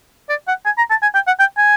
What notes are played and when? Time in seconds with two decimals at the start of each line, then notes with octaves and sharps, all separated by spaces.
0.29 D5
0.48 F#5
0.65 G#5
0.78 A#5
0.90 A5
1.02 G#5
1.14 G5
1.27 F#5
1.39 G5
1.57 G#5